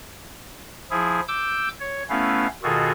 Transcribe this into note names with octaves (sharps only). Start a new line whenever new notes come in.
F3 E4 G#4
D6 E6 G6
C#5
A3 B3 C#4 E4 B4 F5
B2 D#3 F4 F#4 G#4 A4